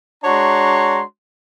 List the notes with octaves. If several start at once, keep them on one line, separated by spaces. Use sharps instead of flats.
G#3 D4 F#4 C#5 A#5 C6